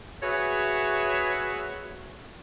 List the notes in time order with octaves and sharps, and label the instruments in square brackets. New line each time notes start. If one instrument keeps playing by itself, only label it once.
[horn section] F#4 G#4 B4 C#5 E5